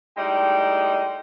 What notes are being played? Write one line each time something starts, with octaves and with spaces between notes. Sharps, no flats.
A2 G3 G#3 D#4 G5